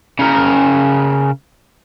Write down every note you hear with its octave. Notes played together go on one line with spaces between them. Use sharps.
C#3 A#4